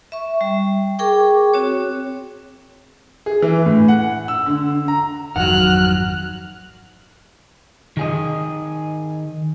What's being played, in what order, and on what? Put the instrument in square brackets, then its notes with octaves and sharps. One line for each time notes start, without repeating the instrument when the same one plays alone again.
[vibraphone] E5 C#6
G3
G#4 A#4 G5 C#6 D6
C4 F#4 C#5
[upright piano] G#4
E3
A2
F#5
E6
D3
D3
A#5
[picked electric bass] G#1 F2 D#3 [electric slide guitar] F#3 F#5 [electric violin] F6 F#6
[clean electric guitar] D#3 G#4 D#5